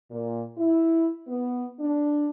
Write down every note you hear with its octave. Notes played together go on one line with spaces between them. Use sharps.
A#2
E4
B3
D4